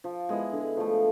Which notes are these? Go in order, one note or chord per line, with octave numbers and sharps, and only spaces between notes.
F3
G#3 B3 E4
D3
F3 A3